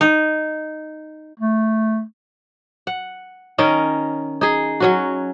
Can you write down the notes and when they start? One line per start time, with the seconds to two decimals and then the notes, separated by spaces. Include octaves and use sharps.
0.01 D#4
1.39 A3
2.87 F#5
3.58 D#3 C#4 D#4 A#4
4.41 D#4 G#4
4.80 F#3 C#4 F#4